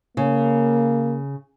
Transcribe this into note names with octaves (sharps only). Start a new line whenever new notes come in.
C#3 A#3